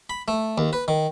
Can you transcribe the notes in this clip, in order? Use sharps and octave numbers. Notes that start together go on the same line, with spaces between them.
B5
A3
D#2
B4
D#3